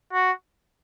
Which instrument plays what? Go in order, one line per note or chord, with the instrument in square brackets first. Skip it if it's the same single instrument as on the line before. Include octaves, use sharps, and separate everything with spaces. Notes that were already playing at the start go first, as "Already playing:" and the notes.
[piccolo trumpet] F#4